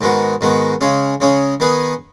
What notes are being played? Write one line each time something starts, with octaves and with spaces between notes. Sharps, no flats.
G#2 D#3 G#3 B3 F#4
G#2 D#3 G#3 B3 F#4
C#3 G#3 C#4 G#4
C#3 G#3 C#4 G#4
D#3 B3 G#4 B4 D#5